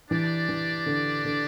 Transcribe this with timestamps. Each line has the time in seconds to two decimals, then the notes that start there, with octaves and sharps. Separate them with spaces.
0.11 E3 D4 G4 D5
0.49 E3
0.86 D3
1.25 D3